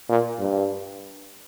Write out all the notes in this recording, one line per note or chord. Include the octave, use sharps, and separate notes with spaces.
A#2
G2